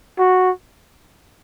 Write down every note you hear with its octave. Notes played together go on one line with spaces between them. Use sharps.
F#4